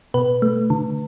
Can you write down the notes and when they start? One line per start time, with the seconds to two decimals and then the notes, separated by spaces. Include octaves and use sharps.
0.14 B2 B4
0.42 A3
0.70 D3